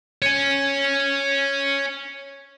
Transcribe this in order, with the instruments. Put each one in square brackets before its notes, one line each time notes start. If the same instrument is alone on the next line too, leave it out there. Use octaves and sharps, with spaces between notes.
[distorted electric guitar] C#5 G#5